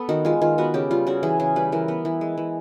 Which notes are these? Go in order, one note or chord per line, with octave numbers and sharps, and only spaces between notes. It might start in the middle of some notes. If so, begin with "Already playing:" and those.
Already playing: B3 A4
D#3 F#4
G#3 F4
D#3 F4
B3 F#4
C#3 G4
G3 F4
C#3 F#4
E3 G#4
C#3 G#4
G3 B4
E3 A#4
B3
E3
G#3
E3